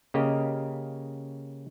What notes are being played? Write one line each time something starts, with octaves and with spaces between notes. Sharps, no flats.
C#3 A#3 G4 D#5